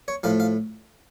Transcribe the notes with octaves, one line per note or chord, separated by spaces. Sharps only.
C#5
A2 F3 F5
F5